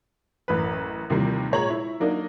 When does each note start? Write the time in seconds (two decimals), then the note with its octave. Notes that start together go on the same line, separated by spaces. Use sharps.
0.48 A1 F#2 B4
1.10 D#2 C3 E3 F3 G3
1.51 A#2 G#3 C#5 A#5 F#7
1.70 E4
2.00 F#3 A#3 D4 D#4